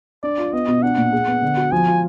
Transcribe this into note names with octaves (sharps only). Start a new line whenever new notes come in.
D4 D5
F4
B3 D#5
B2
D4 F#5
A#2
G#4
B3
D3
F#4
F3 G#5
F4